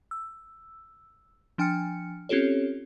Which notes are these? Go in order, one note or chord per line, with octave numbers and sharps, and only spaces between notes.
E6
F3 D4 G5 G#5 F6 C#7
C4 C#4 F4 G4 A4 C#5